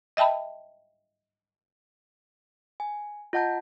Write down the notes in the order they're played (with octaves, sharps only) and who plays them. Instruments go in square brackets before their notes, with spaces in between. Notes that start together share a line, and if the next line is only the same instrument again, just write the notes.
[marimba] D#5 E5 G5 A5 B5
[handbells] G#5
F4 D#5 F#5 A5 G6